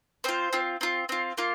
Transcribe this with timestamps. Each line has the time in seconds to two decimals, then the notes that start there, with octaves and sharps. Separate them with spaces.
0.24 C4 F4 C5
0.53 C4 F4
0.81 C4 F4
1.09 C4 F4
1.38 A#3 F4